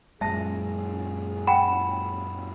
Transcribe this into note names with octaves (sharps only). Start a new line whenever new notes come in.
F#2 A#2 G#3 G#4 E5 A5
F#5 G5 B5